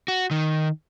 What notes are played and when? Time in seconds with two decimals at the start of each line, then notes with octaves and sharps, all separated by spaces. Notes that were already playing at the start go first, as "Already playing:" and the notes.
0.08 F#4
0.31 D#3